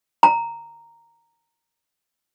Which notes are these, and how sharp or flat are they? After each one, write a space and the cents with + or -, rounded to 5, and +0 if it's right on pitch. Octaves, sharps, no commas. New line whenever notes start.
A#5 -5